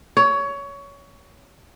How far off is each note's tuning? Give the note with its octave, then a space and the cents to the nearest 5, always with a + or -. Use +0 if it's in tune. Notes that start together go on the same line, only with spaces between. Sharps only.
C#5 +20